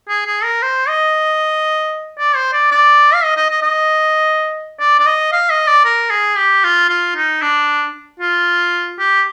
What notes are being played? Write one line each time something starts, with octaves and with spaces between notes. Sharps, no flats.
G#4
G#4
A#4
C5
D#5
D5
C5
D5
D5
F5
D#5
D#5
D#5
D#5
D5
D5
D#5
F5
D#5
D5
A#4
G#4
G4
F4
F4
D#4
D4
F4
G4